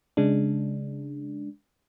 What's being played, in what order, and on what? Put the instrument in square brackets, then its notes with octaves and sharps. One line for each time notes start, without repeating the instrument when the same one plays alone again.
[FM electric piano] C#3 G#3 D4